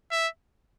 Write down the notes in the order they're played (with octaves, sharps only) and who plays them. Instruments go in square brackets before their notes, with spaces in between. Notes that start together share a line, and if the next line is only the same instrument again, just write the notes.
[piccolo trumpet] E5